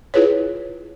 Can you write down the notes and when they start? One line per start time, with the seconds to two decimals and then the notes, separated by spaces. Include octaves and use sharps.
0.14 E4 F4 G#4 B4 C#5